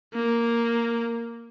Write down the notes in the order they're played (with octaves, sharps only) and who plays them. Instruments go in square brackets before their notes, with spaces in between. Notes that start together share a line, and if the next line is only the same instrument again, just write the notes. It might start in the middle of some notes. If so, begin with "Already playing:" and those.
[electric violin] A#3